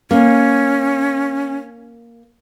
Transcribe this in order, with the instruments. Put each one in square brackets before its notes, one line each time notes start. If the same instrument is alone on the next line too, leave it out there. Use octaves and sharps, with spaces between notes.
[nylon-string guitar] A#3 [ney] C#4